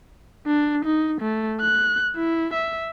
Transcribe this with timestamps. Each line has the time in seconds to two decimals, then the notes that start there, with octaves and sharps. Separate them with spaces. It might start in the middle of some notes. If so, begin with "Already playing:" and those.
0.46 D4
0.85 D#4
1.21 A3
1.61 F#6
2.15 E4
2.54 E5